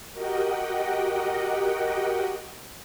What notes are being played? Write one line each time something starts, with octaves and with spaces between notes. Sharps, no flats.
F#4 G4 A#4 D#5 F#5 G5